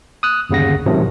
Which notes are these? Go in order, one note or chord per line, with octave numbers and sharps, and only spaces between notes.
D#6 F#6
G1 D#2 C#3 F#5 A#6
A1 G#2 C3 D#3 F3 F#3